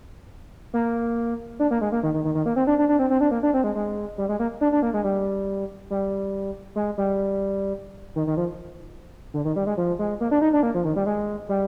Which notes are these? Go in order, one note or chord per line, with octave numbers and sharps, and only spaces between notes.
A#3
D4
A#3
G#3
A#3
D#3
D#3
D#3
D#3
A#3
C4
D4
D4
D4
C4
C4
D4
A#3
D4
C4
G#3
G#3
G3
G#3
A#3
D4
D4
A#3
G#3
G3
G3
G#3
G3
D#3
D#3
F3
D3
D#3
G3
G#3
F3
G#3
A#3
D4
D#4
D4
A#3
F3
D#3
G3
G#3
G3